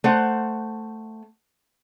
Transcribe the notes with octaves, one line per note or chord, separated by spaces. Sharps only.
A3 C5 F#5